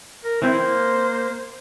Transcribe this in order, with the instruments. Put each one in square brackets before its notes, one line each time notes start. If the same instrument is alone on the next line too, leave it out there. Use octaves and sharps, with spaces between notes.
[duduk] A#4
[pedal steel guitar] E3 C4 E4 [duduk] C5
[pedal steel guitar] A#3